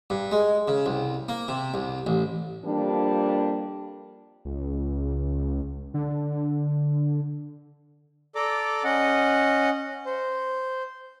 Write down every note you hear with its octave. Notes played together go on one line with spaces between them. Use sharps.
G2
G#3
C#3
C2
A#3
C3
C2
A1
F2 G3 A#3 D4
C#2
D3
A4 D5 A#5 D6
C#4 D#5 F#5
C5